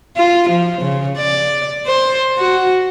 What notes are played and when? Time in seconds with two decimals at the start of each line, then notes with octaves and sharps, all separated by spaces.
0.16 F4
0.49 F3
0.81 C#3
1.18 D5
1.86 C5
2.38 F#4